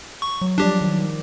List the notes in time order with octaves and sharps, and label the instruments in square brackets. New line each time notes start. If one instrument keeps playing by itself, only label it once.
[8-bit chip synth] C#6
[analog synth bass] F#3
[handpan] F3 G3 D5 [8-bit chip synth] D4 G4
[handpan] D#3